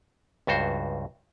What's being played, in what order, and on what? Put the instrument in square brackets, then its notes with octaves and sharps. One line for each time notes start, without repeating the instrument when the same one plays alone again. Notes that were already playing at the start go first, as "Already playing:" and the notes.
[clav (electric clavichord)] C#2 G2 F#4 C5